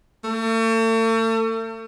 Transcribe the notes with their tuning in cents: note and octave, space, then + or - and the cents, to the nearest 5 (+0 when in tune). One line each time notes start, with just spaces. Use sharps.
A3 +40